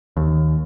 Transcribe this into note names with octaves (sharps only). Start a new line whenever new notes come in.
D#2